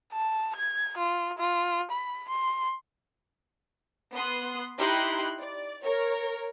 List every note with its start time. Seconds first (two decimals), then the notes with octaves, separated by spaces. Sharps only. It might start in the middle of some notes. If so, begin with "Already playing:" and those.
0.13 A5
0.56 G#6
0.97 F4
1.39 F4
1.92 B5
2.29 C6
4.15 B3 C6 D#6 F#6
4.78 D#4 E4 G4 B5 C6 F#6
5.40 D5
5.84 A#4 C#5